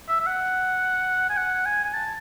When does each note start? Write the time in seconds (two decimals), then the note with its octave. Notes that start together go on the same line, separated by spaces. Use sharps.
0.08 E5
0.20 E5
0.26 F#5
1.30 G#5
1.37 F#5
1.66 G#5
1.84 G#5
1.94 A5